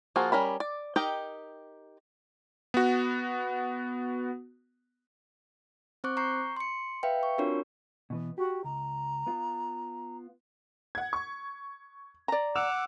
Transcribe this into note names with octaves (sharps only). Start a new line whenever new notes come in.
F3 A#3 F4 F#4 G#4
G3 C#4 A#4 B5
D5
D#4 G4 A#4 D#5 G5
B3 F#4
C4 C5 C#6 D6 F#6
A#5 C#6 G6 C7
C6 C#7
B4 E5 F5 G5
C#6
C4 D4 F4 F#4 A#4 C#5
B2 E3 B3
F#4 G4
C#2 A#5
B3 F4
F#5 G#6
C#6
D5 A#5
F#5 D6 E6 E7 F7